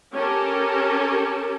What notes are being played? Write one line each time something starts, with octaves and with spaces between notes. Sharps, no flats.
C#4 G4 A4 A#4